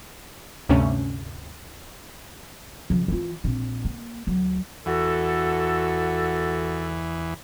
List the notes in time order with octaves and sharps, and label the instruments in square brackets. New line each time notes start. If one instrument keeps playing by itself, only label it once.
[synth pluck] D2 G2 C3 A3 C#4
[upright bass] C#3 F3
E3 F4
A#1 C4
A#3
D2 F#3
[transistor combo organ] E2 E3 [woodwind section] F#4 A4